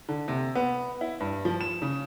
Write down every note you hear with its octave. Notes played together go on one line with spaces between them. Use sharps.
D3
C3
B3
E4
G2
F3
E7
C#3